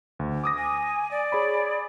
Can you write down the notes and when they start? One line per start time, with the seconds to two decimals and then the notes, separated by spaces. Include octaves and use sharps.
0.19 D2
0.44 D6 D#6 A#6
0.58 G#5
1.11 D5
1.32 G#4 C#5 B5